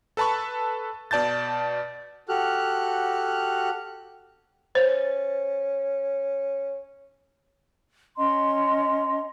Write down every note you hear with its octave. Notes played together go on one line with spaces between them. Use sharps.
A4 B4 A5 B5 C#6
B2 D5 A5 G6 A6
F#4 G4 A4 F6 F#6
C#4 C5
C#4 D#5 A#5 C6